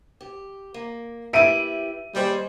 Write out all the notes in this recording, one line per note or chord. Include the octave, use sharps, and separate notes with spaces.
G4
A#3
E4 G4 B4 E5 D7 D#7
D#2 G3 G#4 C5